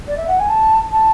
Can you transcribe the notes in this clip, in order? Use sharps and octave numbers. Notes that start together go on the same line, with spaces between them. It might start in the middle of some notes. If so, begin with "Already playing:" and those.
D5
E5
F#5
G#5
A5
A5